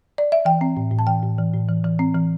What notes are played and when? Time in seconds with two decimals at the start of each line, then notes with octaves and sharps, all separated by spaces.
0.18 D5
0.32 E5
0.45 E3 G5
0.61 C4
0.77 A2
0.91 A2
0.99 A5
1.07 E3 G5
1.23 A2
1.38 E3
1.53 A2
1.69 E3
1.85 E3
1.99 C4
2.15 E3